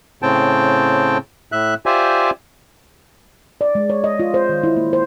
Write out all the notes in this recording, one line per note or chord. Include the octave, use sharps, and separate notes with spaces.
A2 C#3 C4 G5 A5
A2 E5 F#6
F4 G4 C5 D5 E5 G#5
D5
G#3
C#5
D#5
F4
C5
D#3
E4
A#3
C5